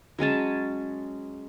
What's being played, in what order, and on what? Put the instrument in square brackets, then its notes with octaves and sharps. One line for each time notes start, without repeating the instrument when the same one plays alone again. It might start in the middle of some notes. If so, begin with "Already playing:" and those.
[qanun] F#3 G#3 C#4 A5